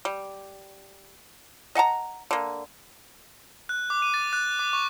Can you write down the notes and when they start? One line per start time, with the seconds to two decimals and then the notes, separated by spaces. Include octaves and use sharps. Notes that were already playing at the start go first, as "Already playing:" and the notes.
0.05 G3
1.75 D#5 F#5 A5 A#5
2.31 D3 A#3
3.69 F#6
3.90 D6
4.02 D#7
4.14 A6
4.33 F#6
4.59 D6
4.73 C#6